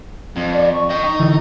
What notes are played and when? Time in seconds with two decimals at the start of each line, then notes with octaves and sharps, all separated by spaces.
0.36 F2
0.54 D5
0.73 C#6
0.90 D#5 G5
1.04 D#4
1.19 D3 E3